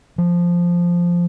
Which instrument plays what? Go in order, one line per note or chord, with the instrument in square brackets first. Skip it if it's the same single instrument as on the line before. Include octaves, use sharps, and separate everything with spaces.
[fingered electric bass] F3